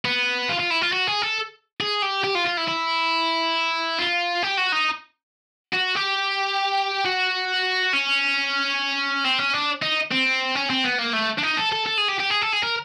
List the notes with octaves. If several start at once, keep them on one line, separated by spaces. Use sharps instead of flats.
B3
F4
F4
E4
F4
F#4
G#4
A4
G#4
G4
G4
F4
F4
E4
E4
F4
G4
F#4
D#4
F#4
G4
F#4
C#4
C4
C#4
D4
D#4
C4
C#4
C4
B3
A#3
A3
D4
D#4
A4
A4
A4
G#4
G4
G4
G#4
A4
G#4
A#4